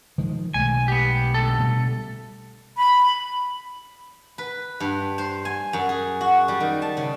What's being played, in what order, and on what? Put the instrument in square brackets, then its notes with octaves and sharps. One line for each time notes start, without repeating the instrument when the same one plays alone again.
[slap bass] D#3 F3 G#3
[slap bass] B1 G#3 A3 [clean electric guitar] G#5
[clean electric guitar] B3 G4
D2 A4
[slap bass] B2 G3 A3
[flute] B5
[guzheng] B4
G2
C5
G#5
F#2
G#4
F#4
G3
D#3
A5
C#3